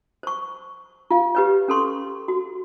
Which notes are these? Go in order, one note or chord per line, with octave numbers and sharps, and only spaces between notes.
C5 C#6
F4 F5
G4 B4 C#5
C#4 A4 C6 C#6
F#4